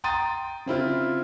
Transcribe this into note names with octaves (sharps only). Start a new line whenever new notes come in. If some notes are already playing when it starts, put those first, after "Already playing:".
G5 A#5 C6 D#6 A6 D#7
C#3 C4 E4 F4